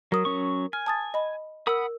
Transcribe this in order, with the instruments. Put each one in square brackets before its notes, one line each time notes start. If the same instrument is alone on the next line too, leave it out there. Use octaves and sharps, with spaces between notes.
[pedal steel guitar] F#3 [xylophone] A#4 D#6
[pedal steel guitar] F#3 C#4 C#6
[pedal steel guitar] G#5 [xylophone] F6
[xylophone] A5 D#6 A6
D#5 B5
[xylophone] A#4 E6 [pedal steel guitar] F#5 B5 D#6